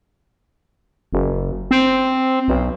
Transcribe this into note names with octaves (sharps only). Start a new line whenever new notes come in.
F#1
C4
B1